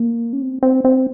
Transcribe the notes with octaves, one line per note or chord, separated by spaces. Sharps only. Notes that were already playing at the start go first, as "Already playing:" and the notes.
Already playing: A#3
C#4
C4
C4
C4